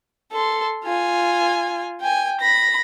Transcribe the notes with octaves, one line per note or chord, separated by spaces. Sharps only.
A4 C6
F4 G#5
G5 G#5
B5 A#6